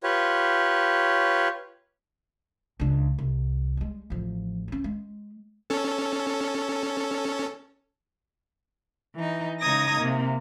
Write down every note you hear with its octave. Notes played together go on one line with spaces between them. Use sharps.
F4 G4 B4 C#5
C#2 D4
C2
G3 G#3
A1 F3
F#3 C#4
G#3
C#4 A4
E3 D#4
C#3 G#3 D#4 D#6 G#6 A#6
C3 A#3